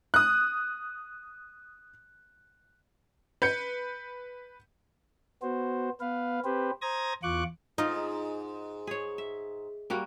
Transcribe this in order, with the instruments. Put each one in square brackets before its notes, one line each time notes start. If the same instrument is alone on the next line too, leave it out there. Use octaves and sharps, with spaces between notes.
[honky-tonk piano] D#6 F#6
B4 G6 C#7
[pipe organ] B3 F#4 C5
B3 B4 F5
C4 G4 B4 C5
C5 A#5 D#6 G#6 A#6
E2 F4 C#6 D6 F#6
[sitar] G#2 [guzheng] D#4 D#5 [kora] F4
[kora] G#4 C#5
E5
G3 A#3 F#4